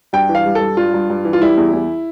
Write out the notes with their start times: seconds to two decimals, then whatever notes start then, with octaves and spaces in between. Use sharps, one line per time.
0.13 G2 G5
0.29 E3
0.35 F5
0.46 G3
0.55 A4
0.61 G2
0.77 G2 F4
0.94 G2
1.10 G2
1.25 E3
1.33 F4
1.42 G3 E4
1.57 E2
1.73 E2